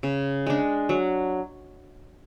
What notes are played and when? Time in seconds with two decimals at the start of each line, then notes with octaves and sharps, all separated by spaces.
0.03 C#3
0.47 G#3 D4
0.89 F#3